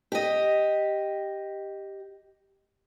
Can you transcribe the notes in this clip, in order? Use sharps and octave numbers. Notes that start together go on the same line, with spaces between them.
G4 D#5